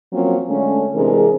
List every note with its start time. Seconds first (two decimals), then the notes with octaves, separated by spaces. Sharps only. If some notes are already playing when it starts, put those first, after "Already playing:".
0.12 F3 F#3 A#3 C4 C#4 F4
0.49 D3 G#3 A3 C#4
0.94 C3 E3 G#3 D4 G#4 A#4